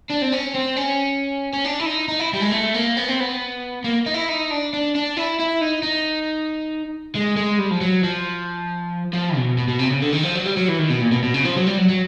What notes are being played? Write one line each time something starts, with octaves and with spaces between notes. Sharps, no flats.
D4
C4
C#4
C4
C#4
C#4
D4
E4
D#4
D#4
E4
G3
G#3
A3
A#3
B3
C4
B3
A#3
D#4
E4
D#4
D4
D4
D4
E4
E4
D#4
D#4
G#3
G#3
G3
F3
F#3
F3
F3
B2
B2
B2
C3
C#3
D3
D#3
F3
F#3
G3
F#3
E3
D#3
B2
A#2
B2
B2
C#3
F3
F#3
G3
F#3
F#3